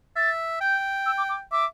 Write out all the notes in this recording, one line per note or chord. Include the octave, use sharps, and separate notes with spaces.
E5 A6
G5 G6
E6
D6
D6
E5 D6